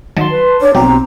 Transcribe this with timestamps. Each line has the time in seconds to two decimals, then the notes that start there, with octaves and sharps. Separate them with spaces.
0.17 D#3 F#3 A5 C6
0.31 B4
0.61 D4 C#5
0.75 B1 F#3 C4 G4 A#5